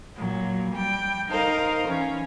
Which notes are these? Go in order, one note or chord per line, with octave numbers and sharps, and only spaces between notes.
A#2 F#3
G3 G5
D#4 A#4 C5 F5
E3 C#4